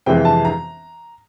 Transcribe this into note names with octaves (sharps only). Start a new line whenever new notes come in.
F2 C3 E3 G#3 G5
A5
A#5